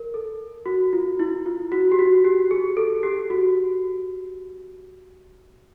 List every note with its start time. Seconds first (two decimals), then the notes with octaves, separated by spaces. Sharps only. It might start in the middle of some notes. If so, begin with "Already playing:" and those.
Already playing: A#4
0.14 A4
0.66 F#4
0.93 F4
1.19 E4
1.46 F4
1.72 F#4
1.92 G4
1.99 F#4
2.25 G4
2.51 G#4
2.77 A4
3.03 G4
3.30 F#4